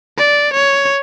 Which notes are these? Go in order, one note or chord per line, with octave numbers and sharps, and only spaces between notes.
D5
C#5